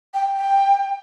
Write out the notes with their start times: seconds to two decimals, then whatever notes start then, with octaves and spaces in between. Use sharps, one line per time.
0.14 G5
0.36 G5